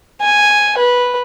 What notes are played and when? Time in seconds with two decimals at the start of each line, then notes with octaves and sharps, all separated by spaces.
0.22 G#5
0.78 B4